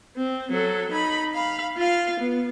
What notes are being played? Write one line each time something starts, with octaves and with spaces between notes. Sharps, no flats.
C4
F#3 A4
D#4 B5
F5 B5
F4 F5
B3